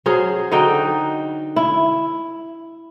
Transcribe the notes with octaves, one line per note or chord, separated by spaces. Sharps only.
F#3 C#4 G#4 C5
D3 D#4 F#4 G5
E4